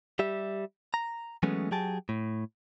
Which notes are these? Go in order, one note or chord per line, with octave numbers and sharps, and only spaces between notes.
G3 G4 E5
A#5
E3 F#3 G#3 A3 B3 C#4
F#3 G4 G#4 G5 A5
A2